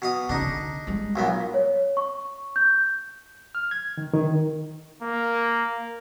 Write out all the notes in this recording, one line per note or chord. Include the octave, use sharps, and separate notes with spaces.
B2 F5 D#6
C#3 D4 D#4
D3
G3 G#3
B1 A#2 B3
C#5
C#6
G6
F6
G#6
D#3
D#3
A#3